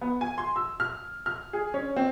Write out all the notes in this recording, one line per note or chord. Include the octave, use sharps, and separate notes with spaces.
B3
G#5
C6
E6
F6
F6
G#4
C#4
C4